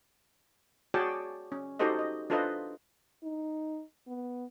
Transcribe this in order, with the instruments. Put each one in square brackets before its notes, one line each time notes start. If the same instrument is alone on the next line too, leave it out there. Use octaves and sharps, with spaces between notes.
[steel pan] F#4 G#4 C#5 D5 G5 A5
C#4
D#4 F#4 G4 A4 C5 D#5
D#5
D4 F4 A4 B4 C5 D#5
[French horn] D#4
B3